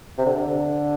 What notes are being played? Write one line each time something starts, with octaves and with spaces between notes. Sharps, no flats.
C3
D3